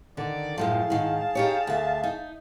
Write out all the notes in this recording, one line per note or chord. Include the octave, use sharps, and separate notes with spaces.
D3 D#3 D5
F#2 A2 F3 G#4 F5 A5
G#2 D#3
D#4 G4 C#5
D2 E5
D#4